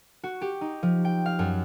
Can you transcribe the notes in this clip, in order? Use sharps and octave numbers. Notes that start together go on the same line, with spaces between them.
F#4
G4
D#4
F3
G5
F5
F#2